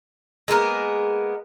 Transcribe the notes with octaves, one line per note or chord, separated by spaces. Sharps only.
G#3 A#3 B3 A#4